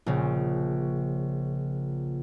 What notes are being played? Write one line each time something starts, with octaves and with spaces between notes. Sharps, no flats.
A#1 C#3